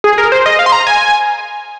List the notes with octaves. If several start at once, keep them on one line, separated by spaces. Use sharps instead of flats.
G#4
A#4
C5
D#5
F5
C6
A#5
G#5